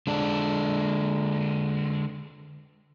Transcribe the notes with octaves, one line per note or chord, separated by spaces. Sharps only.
D3 G#3 D4